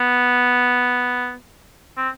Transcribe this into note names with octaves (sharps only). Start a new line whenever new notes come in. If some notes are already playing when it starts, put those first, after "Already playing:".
Already playing: B3
C4